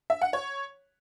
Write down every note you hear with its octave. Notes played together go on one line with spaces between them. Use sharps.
E5
F#5
C#5